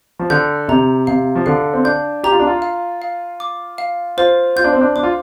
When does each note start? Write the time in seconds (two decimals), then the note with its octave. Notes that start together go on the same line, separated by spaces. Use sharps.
0.19 F3
0.30 D3 G6
0.68 C3 A#5
1.07 C3 F5
1.35 F3
1.46 D3 F5
1.73 C4
1.85 D4 G6
2.24 G4 A#5
2.32 F4
2.39 D4
2.47 F4
2.62 F5
3.02 F5
3.40 D6
3.78 F5
4.17 F4 C5
4.56 F4 G6
4.64 D4
4.73 C4
4.81 D4
4.96 D4 D6
5.03 F4